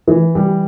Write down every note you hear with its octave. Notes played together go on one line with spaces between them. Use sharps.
E3
G3